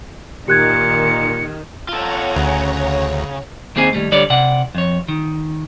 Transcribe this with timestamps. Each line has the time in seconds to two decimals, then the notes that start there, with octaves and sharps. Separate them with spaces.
0.48 A#2 D#3 G4 F#6 G#6 C#7
1.89 F4 A4 C#5 F#5 A#5
2.36 D2 C#3
3.76 D#2 A#3 C4 G#4 G#5
3.93 D#2 A#2 G3 A3
4.12 D3 G3 C#5 D5
4.30 C3 D5 F#5
4.75 F2 C#5
5.08 D#3